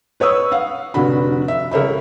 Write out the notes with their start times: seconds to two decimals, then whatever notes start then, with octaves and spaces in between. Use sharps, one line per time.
0.20 B4 C#5 C#6 D#6 E6
0.52 F5 F#5
0.94 F1 D3 F#4 B5
1.48 E5
1.71 C#2 A#4 C#5 E5 B5